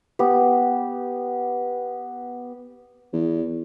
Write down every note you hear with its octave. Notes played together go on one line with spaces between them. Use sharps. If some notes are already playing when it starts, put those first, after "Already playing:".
B3 G4
E2